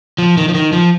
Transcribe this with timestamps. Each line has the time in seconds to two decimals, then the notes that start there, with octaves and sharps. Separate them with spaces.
0.18 F3
0.37 D#3
0.48 F3
0.54 D#3
0.73 F3